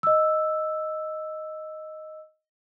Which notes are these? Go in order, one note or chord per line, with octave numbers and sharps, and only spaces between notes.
D#5 E6